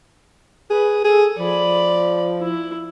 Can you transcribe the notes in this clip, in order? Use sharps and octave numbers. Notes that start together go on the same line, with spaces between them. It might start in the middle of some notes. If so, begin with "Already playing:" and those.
G#4 B4
G#4 A4
F3 D5 B5
E4